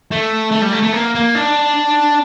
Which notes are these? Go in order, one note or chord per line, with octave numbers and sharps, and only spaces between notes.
A3
A3
G3
A3
A3
A#3
A#3
D4